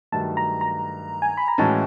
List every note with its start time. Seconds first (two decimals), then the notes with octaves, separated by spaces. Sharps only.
0.12 G2 D#3 F#3 A3 A5
0.37 A#5
0.61 A#5
1.22 G#5
1.37 B5
1.48 A#5
1.58 A2 E3 G#3 C#4 F#4 A5